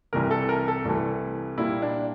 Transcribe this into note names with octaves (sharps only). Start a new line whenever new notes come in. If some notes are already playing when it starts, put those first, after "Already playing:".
C2 C3 E3 A3 A#4
A4
A#4
A4
C2 C3 E3 A3
A#2 G3 A#3 E4
D4